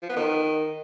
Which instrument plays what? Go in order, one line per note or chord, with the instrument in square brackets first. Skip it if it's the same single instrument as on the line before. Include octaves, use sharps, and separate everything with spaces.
[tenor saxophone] F3
B3
D#3